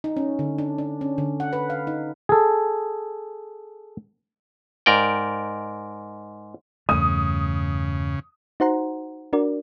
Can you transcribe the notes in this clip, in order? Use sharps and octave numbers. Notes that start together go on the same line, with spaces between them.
D#4
C#4
D3
D4
D4
C#4
D3
F#5
B4
F5
D#4
G#4 A4
G#2 A#4 D5 G5
E2 G2 C#3 A3 D#6
D#4 F#4 C5 F#5 A#5 C6
D4 F#4 A#4 D5